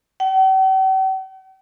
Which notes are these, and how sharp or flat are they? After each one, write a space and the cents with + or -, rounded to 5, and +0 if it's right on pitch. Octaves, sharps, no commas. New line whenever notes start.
G5 -45